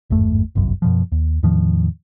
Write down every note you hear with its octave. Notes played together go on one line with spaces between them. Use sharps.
G#1 E2 G2 A3
G1 C2 F#2
F#2 B2 F3
D#2
E2 A2 D#3 F3